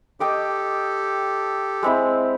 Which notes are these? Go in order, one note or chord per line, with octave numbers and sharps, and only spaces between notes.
G4 A4 D#5 G5 D6
G#3 C4 E4